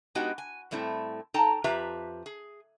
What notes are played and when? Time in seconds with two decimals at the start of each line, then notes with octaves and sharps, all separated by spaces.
0.15 G#3 B3 D#4 F#4 G4
0.38 G#5
0.71 A2 G3 A3 C4 E4
1.34 D#4 A4 G5 A5 A#5
1.64 F2 F4 G4 B4 E5 A#5
2.26 G#4